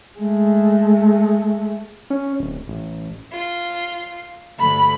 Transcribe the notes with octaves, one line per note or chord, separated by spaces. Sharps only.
G#3 A3
C#4
D1
A1
F4
D2 G2 D3 B5